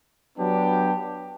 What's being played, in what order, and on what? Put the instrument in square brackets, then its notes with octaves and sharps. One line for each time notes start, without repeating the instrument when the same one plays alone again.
[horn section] F#3 B3 D4 G4